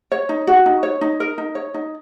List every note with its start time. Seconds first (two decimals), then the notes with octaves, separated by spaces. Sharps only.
0.12 C#5
0.29 D#4
0.47 F#4
0.66 D#4
0.83 C#5
1.01 D#4
1.20 A#4
1.38 D#4
1.55 C#5
1.74 D#4